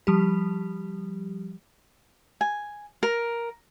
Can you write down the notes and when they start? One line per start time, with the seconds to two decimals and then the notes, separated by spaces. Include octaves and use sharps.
0.07 F3 G3 G4
2.41 G#5
3.03 A#4